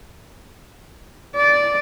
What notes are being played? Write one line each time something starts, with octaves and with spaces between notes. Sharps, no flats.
D5